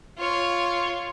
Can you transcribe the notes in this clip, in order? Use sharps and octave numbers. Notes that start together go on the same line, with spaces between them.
F4 C#5